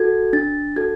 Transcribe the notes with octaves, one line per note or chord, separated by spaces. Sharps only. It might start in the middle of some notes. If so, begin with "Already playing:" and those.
Already playing: F#4 A4 G#6
D4 A6
F#4 A4 G#6